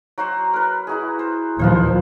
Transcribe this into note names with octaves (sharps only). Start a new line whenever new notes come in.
F#3 F#4 C5
A#4 B4
E4 F#4 G#4
C5
D#2 A#2 F3 B3 F4 C5